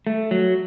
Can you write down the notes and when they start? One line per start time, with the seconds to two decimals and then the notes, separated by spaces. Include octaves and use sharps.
0.07 A3
0.31 F#3